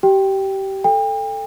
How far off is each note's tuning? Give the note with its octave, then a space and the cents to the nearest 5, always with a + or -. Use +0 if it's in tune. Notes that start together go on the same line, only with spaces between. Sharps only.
G4 -25 G5 +0
A4 +0 G5 +35